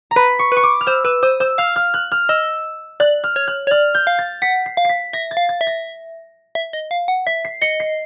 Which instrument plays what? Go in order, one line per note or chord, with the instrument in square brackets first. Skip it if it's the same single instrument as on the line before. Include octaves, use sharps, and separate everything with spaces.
[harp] A#5
[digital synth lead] B4 [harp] B5
[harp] C#6
[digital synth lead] B4 [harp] C#6
[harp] D6
F6
[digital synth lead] C5 [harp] E6
[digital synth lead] B4 [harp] E6
[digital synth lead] C5 [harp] D#6
[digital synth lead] C5 [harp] E6
[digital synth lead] F5 [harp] F6
[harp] F6
F#6
F6
[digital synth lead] D#5 [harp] E6
[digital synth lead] D5 [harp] F#6
[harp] F6
[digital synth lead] C#5
[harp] F#6
[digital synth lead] C#5
[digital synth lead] D5 [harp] F6
[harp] G6
[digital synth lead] F5
[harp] A6
[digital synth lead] F#5 [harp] B6
[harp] C7
[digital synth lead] F5
[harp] B6 C7
[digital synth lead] E5 [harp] A#6
[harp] A6
[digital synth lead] F5
[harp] A6
[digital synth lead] E5
[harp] A#6
[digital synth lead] E5
D#5
F5
F#5
[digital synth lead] E5 [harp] B6
[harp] C7
[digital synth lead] D#5 [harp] C#7
[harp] C7